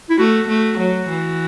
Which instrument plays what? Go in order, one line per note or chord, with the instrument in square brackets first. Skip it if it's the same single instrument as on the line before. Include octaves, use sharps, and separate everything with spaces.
[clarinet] E4
[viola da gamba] A3 [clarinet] F#4
[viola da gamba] A3
F#3
E3